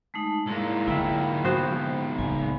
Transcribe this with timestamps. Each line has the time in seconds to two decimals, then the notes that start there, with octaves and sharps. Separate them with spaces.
0.14 G#3 A3 D#4
0.47 G#2 A#3 E4
0.87 D3 E4 F4 E5 F#5 G5
1.45 B3 F#4 C5
2.18 C#2 A2 G#5